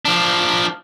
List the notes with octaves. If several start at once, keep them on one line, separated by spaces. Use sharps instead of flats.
F3 D4